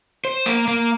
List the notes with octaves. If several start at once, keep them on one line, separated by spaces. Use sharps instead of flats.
C5
A#3
A#3